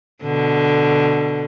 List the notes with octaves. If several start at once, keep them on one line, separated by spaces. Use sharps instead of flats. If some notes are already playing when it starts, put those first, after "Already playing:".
B2 D3